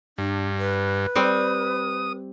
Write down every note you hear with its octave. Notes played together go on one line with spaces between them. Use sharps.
G2 D4
B4
G3 C4 D#6